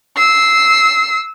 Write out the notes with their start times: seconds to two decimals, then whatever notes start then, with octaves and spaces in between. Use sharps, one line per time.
0.16 E6 C7